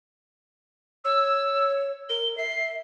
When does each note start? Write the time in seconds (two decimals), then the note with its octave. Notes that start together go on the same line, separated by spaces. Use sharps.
1.05 C#5 E6
2.09 A#4 G7
2.37 E5 C7